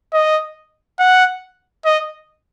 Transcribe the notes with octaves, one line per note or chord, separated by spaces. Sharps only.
D#5
F#5
D#5